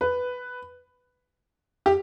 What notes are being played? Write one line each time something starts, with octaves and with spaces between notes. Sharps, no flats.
B4
G4